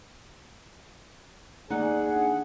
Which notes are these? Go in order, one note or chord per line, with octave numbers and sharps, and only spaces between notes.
D#2 D#4 G#4 D5 F#5
D4